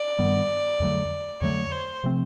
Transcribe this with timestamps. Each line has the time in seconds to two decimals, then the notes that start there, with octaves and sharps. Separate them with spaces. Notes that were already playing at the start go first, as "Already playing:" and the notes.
Already playing: D5
0.19 G2 D#3 G3 B3
0.80 F2 D3 F#3 A3
1.42 F2 D3 F#3 A3 C#5
1.72 C5
2.04 C3 F3 A3 C4